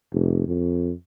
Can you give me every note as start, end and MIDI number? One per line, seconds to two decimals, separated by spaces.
0.12 0.48 29
0.48 0.93 41